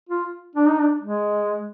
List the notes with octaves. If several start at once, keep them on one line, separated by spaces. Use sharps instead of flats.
F4
D4
D#4
D4
G#3